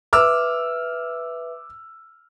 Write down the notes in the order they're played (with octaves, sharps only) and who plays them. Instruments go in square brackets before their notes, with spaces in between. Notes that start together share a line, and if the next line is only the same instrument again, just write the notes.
[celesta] B4 E5 [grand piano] D6 E6 F6